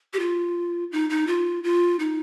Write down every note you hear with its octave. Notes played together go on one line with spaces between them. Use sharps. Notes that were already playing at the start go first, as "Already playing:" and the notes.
G4
F4
D#4
D#4
F4
F4
D#4